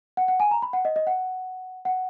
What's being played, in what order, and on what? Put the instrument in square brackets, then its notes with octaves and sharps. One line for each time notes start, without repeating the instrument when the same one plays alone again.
[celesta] F#5
F#5
G#5
A#5
B5
F#5
D#5
D#5
F#5
F#5